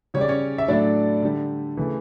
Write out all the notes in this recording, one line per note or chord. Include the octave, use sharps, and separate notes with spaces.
C#3 G3 C#5
D5
C#4 C#5
E5
A2 F#3 A3 D4 D5
D3 G3
C#3 E3 A3